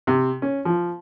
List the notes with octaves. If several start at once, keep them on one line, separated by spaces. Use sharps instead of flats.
C3
C#4
F3